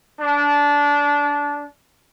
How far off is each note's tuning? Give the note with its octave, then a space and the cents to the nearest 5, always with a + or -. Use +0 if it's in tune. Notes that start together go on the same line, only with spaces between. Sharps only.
D4 -20